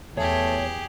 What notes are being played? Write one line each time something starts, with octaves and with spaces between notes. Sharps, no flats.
E2 A3 G4 G#4 C#5